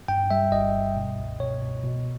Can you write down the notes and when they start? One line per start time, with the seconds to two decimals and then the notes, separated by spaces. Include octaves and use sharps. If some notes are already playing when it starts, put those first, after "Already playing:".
0.08 G2 G5
0.31 G3 E5
0.52 G1 D#5
0.74 G2
0.97 B2
1.18 C#2
1.40 B2 C#5
1.62 B2
1.84 B2